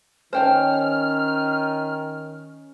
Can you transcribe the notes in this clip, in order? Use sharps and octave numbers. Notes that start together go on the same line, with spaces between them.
D#3 C#4 C5 C#5 G5 A5 F6